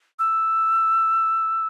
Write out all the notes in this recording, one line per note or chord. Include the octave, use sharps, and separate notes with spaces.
E6